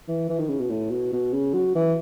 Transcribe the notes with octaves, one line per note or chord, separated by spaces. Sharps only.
E3
E3
D#3
C#3
B2
A2
B2
B2
C#3
F#3
E3